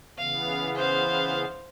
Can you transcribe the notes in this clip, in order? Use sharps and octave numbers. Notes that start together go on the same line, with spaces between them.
C#3 E3 B3 F5
C5 F5